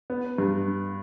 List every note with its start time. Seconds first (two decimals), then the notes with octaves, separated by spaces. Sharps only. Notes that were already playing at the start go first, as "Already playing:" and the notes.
0.10 B3
0.38 G2